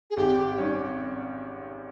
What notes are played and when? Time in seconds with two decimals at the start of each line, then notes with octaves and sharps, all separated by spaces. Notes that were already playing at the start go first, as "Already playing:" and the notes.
0.10 G#4
0.17 G#1 G4
0.58 G#2 G3 C#4